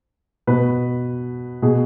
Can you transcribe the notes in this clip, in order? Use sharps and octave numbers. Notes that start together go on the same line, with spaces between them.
B2 B4
B2 G#4